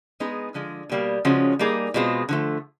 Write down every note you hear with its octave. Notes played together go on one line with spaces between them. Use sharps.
G#3 B3 D#4 G#4
D3 F3 G#3
B2 G3 A#3
C#3 F3 G#3 C#4 F#4
G3 A#3 D#4 G#4
B2 G#3 C4 F4
D3 F3 A3